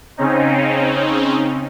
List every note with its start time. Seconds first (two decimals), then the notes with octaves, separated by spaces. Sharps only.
0.17 C#3 C4 C#4 D#4